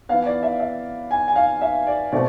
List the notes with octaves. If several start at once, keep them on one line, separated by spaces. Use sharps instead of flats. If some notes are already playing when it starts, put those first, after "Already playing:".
E3 B3 F5
D5
E5
E5
G#5
G#5
F5
E5
D5
B2 A3 C4 D5